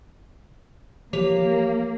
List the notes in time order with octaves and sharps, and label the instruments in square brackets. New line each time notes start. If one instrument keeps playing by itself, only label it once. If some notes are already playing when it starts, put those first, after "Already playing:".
[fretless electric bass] E3 F3 [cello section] A#3 [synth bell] G4 C#5 D6